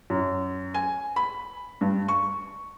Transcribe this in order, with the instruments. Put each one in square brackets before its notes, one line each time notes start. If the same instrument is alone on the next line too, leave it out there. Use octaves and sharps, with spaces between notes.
[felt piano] F#2
G#5
B5
G2
C#6